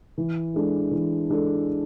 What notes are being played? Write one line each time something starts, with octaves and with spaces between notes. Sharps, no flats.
E3
G#3 D4 A4
E3
G#3 D4 A4